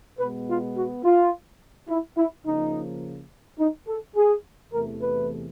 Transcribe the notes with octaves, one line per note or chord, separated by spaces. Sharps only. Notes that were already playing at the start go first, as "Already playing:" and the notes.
B2 G#3 B3 B4
F4
F#4
F4
E4
E4
C#3 F3 A#3 D#4
D#4
A4
G#4
E2 C3 E3 A3 A#4
B4